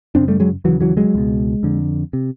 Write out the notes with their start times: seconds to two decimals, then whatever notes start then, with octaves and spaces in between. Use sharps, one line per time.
0.15 F#2 C#3 C4 D4
0.28 G3 A3
0.40 F#3 G#3
0.64 D#2 C#3 E3 F#3
0.80 E3 F#3
0.97 F#3 G#3
1.14 C#2 B2
1.63 F2 D3
2.13 C3